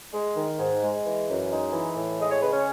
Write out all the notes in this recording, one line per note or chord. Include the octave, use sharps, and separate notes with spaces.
G#3
D#3
G#2
G#3
E3
F#2
G#3 D#4
E3
A2
G#3 D#5
C#5
C#3 B4
C#4 C#5